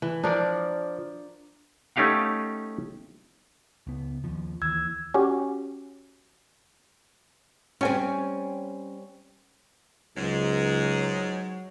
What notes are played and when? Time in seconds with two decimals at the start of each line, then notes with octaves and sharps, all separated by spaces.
0.02 E3
0.23 F3 D4 A#4 D5
1.96 A3 C#4 D#4 G4 F5 F#5
3.87 C#2 B3
4.24 D#2 F3
4.62 D#2 E3 E6 G#6
5.14 C#4 F#4 G4
7.81 G3 C4 C#4 G#5
10.16 C#2 G#2 F#3 G#3